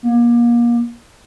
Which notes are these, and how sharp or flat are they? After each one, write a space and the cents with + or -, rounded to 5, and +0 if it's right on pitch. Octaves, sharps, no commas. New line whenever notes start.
A#3 +30